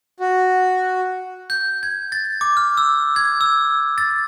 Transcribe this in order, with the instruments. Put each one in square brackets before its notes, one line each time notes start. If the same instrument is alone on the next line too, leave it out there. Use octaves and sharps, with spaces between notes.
[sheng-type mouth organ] F#4
[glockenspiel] G6
G#6
A6
D6
F6
E6
G#6
E6
A6